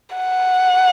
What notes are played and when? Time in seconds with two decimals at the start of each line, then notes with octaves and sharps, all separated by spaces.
0.16 F#5